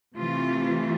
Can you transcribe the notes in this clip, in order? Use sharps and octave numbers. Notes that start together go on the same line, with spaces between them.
C3 E3 A3 F4